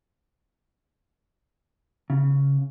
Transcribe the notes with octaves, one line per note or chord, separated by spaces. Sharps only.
C#3